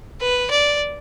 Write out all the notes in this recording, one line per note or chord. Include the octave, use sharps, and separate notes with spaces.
B4
D5